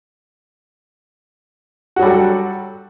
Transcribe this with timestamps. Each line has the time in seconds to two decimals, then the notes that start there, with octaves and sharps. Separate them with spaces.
1.96 F#4
1.99 F#3
2.02 G3
2.06 A4